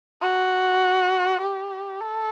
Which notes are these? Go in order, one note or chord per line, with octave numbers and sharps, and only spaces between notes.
F#4
G4
A4